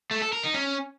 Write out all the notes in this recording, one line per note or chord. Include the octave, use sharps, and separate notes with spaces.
A3
A4
A#4
D#4
C#4